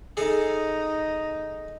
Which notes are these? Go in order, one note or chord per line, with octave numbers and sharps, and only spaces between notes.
D#4 G#4 A4